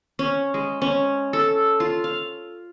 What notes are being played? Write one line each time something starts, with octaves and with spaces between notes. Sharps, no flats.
C#4
G#3
C#4
A4
F4
F5